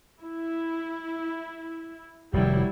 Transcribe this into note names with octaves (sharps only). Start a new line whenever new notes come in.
E4
F1 C3 D#3 F#3 G3 E4